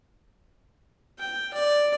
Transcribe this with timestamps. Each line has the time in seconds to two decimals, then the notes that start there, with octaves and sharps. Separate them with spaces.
1.19 G5
1.53 D5